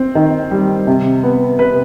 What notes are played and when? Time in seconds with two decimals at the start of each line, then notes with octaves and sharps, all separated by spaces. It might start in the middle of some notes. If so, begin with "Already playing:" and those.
Already playing: C4
0.15 D#3
0.51 G3
0.87 C3
1.23 B3
1.59 C3 B4